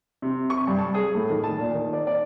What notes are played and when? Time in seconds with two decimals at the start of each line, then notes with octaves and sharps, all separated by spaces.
0.22 C3
0.50 C#6
0.67 G2
0.79 A5
0.94 G#4
1.15 A2
1.30 D#3
1.44 A5
1.59 A#2
1.74 D#3
1.93 D5
2.07 D5